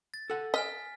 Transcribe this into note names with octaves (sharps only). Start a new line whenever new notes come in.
A6
A4 F#5
D#5 G#5 F6 B6